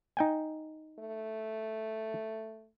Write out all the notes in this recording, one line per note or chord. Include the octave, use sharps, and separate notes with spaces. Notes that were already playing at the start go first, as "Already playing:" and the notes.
D#4 G5 G#5
A3